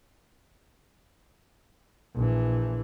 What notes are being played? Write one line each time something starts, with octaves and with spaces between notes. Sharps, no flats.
A#1 E3